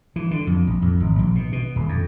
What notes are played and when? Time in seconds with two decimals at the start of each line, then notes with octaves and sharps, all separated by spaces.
0.16 E3
0.31 D3
0.47 F2
0.67 A#1
0.82 F2
1.00 G#1
1.19 A#1
1.35 B2
1.52 B2
1.76 D#1
1.89 F2